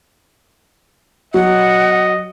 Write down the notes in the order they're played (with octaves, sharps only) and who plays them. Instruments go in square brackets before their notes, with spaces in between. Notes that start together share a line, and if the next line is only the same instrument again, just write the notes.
[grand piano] F#3 [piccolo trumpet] D#5 [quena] F#5